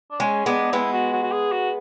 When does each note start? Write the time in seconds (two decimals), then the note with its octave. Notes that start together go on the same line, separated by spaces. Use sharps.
0.11 D4
0.20 G#3 C#4
0.46 G#3 B3 D4
0.73 G#3 B3 E4
0.93 F#4
1.13 F#4
1.23 F#4
1.32 G#4
1.52 F#4